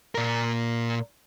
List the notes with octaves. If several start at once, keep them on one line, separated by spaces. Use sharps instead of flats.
A#2 A#4